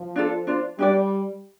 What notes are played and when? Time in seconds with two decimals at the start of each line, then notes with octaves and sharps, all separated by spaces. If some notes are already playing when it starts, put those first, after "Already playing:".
Already playing: F3
0.16 D4 F4 A4
0.47 D4 F4 C5
0.79 G3 D4 G4 B4 D5